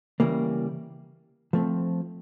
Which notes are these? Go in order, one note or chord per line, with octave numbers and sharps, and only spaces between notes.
C#3 E3 G3 A#3
F3 A3 C4